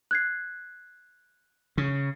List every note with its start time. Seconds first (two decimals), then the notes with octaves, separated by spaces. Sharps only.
0.11 F#6 G#6 C7
1.78 C#3